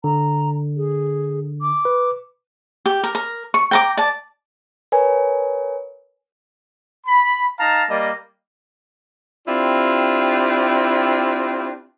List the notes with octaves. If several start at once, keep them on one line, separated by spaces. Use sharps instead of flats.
D3 A#5
G#4
D6
B4
G4
A#4
A#4
C#6
G5 A#5 D6
D5 A5
A#4 B4 C#5 G#5
B5
D#4 F5 A5 A#5
G3 A#3 D5 D#5
C4 D4 E4 F4 G4